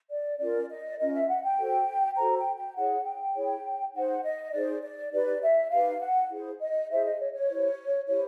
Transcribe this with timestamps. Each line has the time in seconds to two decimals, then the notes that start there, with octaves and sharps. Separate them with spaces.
0.10 D5
0.39 C#4 F4 A#4 D5
0.70 D#5
0.87 D5
0.99 C#4 F4 A#4 D#5
1.13 E5
1.28 F#5
1.44 G5
1.58 F#4 A4 C5
2.17 F#4 A4 C5 A#5
2.36 G5
2.56 G5
2.76 E4 G#4 C#5 F#5
3.05 G5
3.35 E4 G#4 C#5
3.94 D#4 G#4 C5 F#5
4.23 D#5
4.53 D#4 G#4 C5 D5
4.82 D5
5.12 D#4 G4 B4 D5
5.41 E5
5.71 D#4 G4 B4 F5
6.00 F#5
6.30 E4 G#4 C5
6.60 D#5
6.89 E4 G#4 C5 E5
7.04 D#5
7.19 C#5
7.33 C#5
7.48 E4 G4 C5
8.07 E4 G4 C5 C#5